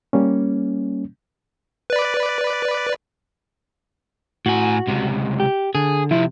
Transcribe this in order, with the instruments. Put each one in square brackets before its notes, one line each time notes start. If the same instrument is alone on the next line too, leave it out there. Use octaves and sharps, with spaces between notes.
[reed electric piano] G3 A#3 C#4
[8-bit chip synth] B4 D5
[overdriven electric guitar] A2 G#5 [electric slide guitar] F#4
[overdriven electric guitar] C#2 C3
[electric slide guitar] G4
[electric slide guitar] D3 [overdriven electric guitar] G#4
[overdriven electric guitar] F2 C3 [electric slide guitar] E4